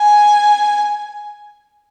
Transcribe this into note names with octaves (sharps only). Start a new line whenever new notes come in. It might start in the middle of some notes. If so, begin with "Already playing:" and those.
Already playing: G#5